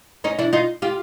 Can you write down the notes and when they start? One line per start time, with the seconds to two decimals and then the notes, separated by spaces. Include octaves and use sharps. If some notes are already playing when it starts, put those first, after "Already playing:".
0.24 C#4 D#4
0.39 D4 E4
0.53 D#4 F4
0.82 F4 G4